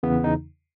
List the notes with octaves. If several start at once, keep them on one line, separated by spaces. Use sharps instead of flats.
E2 C#3 E3 B3
D#4